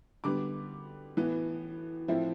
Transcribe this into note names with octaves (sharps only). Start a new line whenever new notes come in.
D3 G3 B3 D6
A2 E3 B3
A2 F3 C4 E4